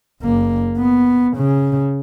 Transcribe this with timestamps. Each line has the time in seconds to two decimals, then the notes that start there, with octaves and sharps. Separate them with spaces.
0.22 F#1 A#3
0.78 B3
1.37 C#3